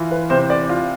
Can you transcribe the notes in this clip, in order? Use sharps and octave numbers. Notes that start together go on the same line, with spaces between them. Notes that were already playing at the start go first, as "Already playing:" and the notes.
Already playing: E3 F4
B4
C3 C5
D5
F4